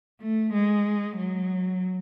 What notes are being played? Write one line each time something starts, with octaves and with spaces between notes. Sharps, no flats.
A3
G#3
F#3